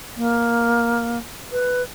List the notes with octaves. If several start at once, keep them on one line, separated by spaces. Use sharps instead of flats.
A#3
B4